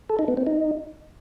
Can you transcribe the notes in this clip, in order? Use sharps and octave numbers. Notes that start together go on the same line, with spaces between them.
A4
D#4
B3
C4
D#4